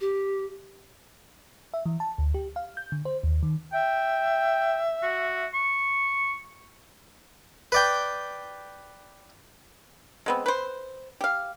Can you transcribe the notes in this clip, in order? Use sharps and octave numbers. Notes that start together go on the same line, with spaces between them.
G4
E5
E3
A5
D2
G4
F5
G6
D3
C5
D#2
D#3
E5 G5
F#4
C#6
B4 D5 G5
G#3 B3 C4
B4 C5
G4 F5